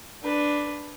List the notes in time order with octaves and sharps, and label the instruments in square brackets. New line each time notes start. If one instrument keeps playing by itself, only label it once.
[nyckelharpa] D4 B4